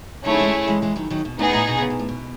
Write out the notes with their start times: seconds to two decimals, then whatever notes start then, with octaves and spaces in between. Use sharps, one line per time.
0.25 D#3 F#3 A3 C#4 E4 G#4 C#5
0.40 E3 G#3
0.67 E3 G#3
0.82 E3 G#3
0.96 D#3 F#3
1.10 D#3 F#3
1.25 B2
1.39 A2 B3 D#4 G#4
1.53 A2
1.68 B2
1.81 C#3
1.90 B2
1.99 A2
2.09 B2